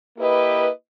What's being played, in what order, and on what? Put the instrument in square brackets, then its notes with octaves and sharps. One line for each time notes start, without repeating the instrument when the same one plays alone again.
[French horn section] A#3 E4 G4 B4 D#5